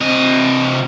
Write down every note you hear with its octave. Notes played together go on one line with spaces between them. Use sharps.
C3 D#5